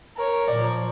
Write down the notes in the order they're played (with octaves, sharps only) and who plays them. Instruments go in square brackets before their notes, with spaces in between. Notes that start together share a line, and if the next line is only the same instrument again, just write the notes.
[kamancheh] A#4 C#5
[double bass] A#2 F3 [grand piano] D5